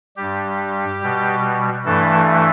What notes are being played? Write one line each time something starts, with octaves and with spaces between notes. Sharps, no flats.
G2 G3 G4
B2 G3
G2 E3 A3 A4